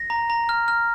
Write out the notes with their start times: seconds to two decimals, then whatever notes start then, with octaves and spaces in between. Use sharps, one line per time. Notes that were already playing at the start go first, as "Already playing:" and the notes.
Already playing: A#6
0.10 A#5
0.30 A#5
0.49 F6
0.68 F6